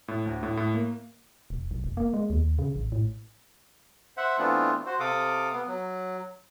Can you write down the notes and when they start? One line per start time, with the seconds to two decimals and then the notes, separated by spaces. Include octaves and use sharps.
0.08 A2
0.26 D2
0.43 A2
0.57 A2
0.74 A#3
1.50 E1
1.71 B1
1.84 F1
1.97 A#3
2.14 G#3
2.30 D#2
2.59 C#3
2.76 A1
2.92 A2
4.17 C5 E5 F#5
4.38 E3 A3 B3 C4 D4 F4
4.86 F#4 C5
5.00 C3 A4 F5 D6 D#6
5.53 B3
5.68 F#3